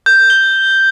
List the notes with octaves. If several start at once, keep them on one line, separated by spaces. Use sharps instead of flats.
G6
G7